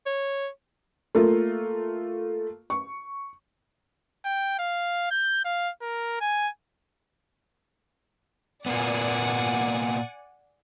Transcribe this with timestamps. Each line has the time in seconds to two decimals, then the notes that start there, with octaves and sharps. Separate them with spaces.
0.06 C#5
1.15 A3 A#3 F4
2.70 C#6
4.24 G5
4.59 F5
5.11 G6
5.45 F5
5.82 A#4
6.21 G#5
8.66 A#2 A#3 B3 D5 F#5 G#5